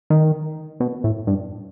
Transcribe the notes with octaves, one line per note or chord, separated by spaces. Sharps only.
D#3
B2
A2
G2